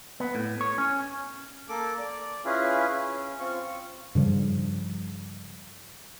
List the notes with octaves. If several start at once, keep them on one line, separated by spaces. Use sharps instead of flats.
B3
A2
C#5
C#4
A#3 A4 D6
D5
C#4 E4 F4 G#4 B4
C#4
C4 F4 C#6
G2 C#3 F3 G3